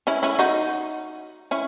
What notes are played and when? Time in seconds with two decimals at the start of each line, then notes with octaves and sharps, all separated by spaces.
0.07 C#4 E4
0.23 C#4 E4
0.39 D#4 F#4
1.51 C#4 E4